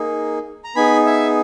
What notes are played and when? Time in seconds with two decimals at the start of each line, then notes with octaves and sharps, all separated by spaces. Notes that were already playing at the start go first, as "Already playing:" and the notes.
Already playing: A#3 D#4 G#4
0.64 A#5
0.76 B3 D#4 G#4 G#5 B5
1.06 E5 G#5